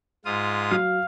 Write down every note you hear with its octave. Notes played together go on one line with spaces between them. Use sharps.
G#2 F4 D#6
F#3 F5